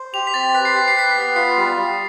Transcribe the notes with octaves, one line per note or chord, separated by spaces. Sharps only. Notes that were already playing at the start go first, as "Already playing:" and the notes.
Already playing: C5
G4 F7
B6
C4 A6
B4 B6
C7
G4 B6
C7
B4 B6
C7
B3
B6
F4 C7
G3
G3